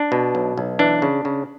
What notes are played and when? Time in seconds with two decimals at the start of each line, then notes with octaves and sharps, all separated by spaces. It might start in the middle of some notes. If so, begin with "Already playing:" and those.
Already playing: D4
0.12 B2
0.35 B1
0.58 B1
0.79 E3 D4
1.02 C#3
1.25 C#3